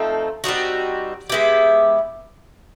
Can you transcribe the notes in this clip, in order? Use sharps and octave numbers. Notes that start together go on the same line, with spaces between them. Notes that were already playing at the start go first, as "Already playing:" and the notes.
Already playing: F3 A3 C4 D#4
G3 C4 D#4 F#4
G#3 B3 E4 G4